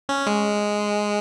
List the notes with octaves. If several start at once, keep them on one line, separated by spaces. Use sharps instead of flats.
C#4
G#3